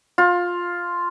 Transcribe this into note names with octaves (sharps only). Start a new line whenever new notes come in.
F4